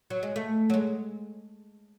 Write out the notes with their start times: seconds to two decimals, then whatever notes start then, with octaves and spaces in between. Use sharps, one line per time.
0.10 F#3
0.23 G#3
0.36 A3
0.70 F#3
0.74 G#3